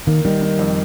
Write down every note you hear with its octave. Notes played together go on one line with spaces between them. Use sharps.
D#3 A#3
D#3 G3
D#3
F2